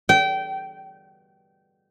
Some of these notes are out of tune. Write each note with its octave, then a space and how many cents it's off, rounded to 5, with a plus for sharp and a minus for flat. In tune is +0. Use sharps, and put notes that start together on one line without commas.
G5 -25